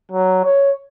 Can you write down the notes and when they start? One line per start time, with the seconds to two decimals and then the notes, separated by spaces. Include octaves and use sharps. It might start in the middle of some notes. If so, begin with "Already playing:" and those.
0.11 F#3
0.44 C#5